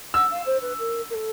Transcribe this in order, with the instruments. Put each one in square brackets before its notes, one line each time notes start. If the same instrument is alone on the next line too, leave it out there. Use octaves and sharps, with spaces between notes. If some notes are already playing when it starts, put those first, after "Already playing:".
[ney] F#5 [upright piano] E6
[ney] F5
C5
B4
A#4
A#4
A4